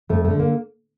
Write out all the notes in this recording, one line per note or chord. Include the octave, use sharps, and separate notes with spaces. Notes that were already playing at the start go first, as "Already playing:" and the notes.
F2 A3
A3
D3
A#3